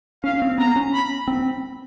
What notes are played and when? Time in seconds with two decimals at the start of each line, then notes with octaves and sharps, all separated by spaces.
0.24 C#4 F5
0.42 C4
0.58 B3 A#5
0.76 C#4
0.93 B5
1.28 C4